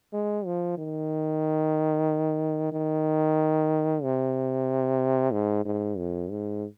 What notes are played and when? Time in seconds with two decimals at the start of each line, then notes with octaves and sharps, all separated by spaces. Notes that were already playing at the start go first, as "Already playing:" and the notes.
0.13 G#3
0.46 F3
0.77 D#3
2.72 D#3
4.03 C3
5.32 G#2
5.65 G#2
5.98 F2
6.30 G#2